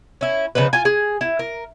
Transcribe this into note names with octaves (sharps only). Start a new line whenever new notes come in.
C#4 E4
C#3 F3 D#4 B4
F4 G#5
G#4
E4
A#4